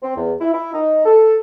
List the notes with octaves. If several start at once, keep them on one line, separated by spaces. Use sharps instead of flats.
C4
E2
E4
E4
D#4
A4